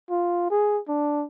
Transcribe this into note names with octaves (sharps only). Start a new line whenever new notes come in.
F4
G#4
D4